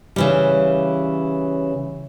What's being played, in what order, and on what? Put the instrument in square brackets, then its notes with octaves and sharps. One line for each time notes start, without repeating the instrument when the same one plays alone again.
[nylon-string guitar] C#3 E3 G3